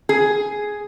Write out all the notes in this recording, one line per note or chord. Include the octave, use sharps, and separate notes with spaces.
G#4